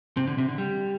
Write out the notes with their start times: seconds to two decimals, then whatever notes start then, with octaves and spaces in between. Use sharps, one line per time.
0.17 C3
0.27 D3
0.38 C3
0.49 D3
0.58 G3